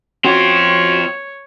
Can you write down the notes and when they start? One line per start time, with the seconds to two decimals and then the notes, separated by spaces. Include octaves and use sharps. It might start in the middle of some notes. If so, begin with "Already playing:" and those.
0.24 C4 C#4 F4 F#4 C#5 G5